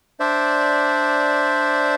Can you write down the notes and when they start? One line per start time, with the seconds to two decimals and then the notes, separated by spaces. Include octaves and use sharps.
0.20 D4 C5 D5 E5